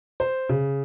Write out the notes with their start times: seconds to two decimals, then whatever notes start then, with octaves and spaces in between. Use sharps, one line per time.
0.20 C5
0.49 C#3